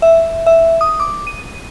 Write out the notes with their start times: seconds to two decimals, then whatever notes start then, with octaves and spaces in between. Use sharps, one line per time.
0.02 E5
0.46 E5
0.81 D#6
1.00 D6
1.27 D#7